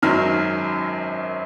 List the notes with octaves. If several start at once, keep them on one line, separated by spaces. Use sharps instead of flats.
G#1 F#2 D#3 F#3 F6